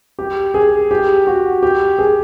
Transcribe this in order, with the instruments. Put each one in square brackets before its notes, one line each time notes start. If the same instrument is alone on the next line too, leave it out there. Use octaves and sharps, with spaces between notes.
[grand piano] G4
G#4
G4
F#4
G4
G#4